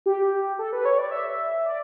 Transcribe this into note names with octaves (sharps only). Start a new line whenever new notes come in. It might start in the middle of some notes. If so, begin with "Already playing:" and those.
G4
A4
B4
C#5
D5
E5
D5